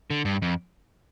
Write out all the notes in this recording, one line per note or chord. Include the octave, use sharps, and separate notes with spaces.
D3
G2
F2